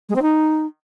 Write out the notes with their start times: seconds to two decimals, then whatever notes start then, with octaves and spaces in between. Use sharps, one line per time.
0.09 G#3
0.16 C4
0.22 D#4